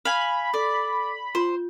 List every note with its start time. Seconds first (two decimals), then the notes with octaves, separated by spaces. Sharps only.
0.05 F5 G#5 B5
0.54 A4 D5
1.35 F4 C5